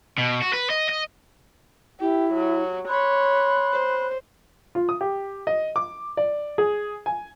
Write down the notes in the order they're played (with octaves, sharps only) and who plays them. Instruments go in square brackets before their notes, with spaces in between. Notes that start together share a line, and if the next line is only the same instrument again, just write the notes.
[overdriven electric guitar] B2
F#4
B4
D#5
D#5
[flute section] E4 [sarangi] G4
[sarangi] F#3
[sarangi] C#5 [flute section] B5 C6 F#6
[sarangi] C5
[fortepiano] F4
D#6
G4
D#5
D6
D5
G#4
G#5